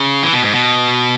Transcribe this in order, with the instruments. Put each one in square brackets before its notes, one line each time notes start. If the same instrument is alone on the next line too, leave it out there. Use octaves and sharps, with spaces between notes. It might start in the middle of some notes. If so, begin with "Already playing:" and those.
Already playing: [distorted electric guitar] C#3
E3
B2
G#2
B2